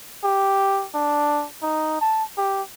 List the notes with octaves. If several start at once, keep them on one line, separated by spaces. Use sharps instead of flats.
G4
D4
D#4
A5
G4